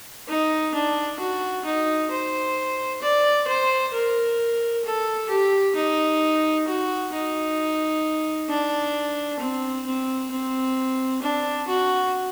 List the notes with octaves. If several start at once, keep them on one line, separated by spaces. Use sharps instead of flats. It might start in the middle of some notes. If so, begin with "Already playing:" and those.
D#4
D4
F#4
D#4
C5
D5
C5
A#4
A4
G4
D#4
F#4
D#4
D4
C4
C4
C4
D4
F#4